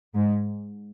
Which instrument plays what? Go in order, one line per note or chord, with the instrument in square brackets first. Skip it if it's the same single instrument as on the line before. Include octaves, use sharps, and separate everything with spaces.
[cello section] G#2